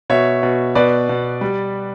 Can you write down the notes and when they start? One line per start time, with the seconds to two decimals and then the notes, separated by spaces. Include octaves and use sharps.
0.10 B2 C#5 E5
0.43 B2
0.75 B2 B4 D5
1.09 B2
1.41 G3